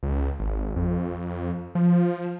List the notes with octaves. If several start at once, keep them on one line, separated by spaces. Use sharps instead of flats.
C#2
G#1
F2
F3